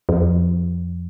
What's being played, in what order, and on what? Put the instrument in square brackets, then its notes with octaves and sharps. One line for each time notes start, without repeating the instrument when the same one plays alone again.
[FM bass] F2